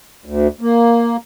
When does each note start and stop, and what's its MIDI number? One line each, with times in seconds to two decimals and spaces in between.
0.26 0.48 38
0.61 1.16 58